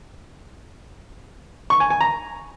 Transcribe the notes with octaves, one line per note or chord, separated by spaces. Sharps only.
C#6
G#5
G#5
A#5